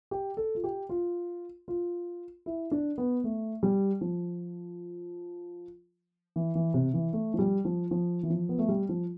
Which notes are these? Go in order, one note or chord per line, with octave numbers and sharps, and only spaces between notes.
G4
A4
F4
G4
F4
F4
E4
D4
B3
A3
G3
F3
E3
E3
C3
E3
A3
F3
G3
F3
F3
E3
F3
B3
A3
G3
F3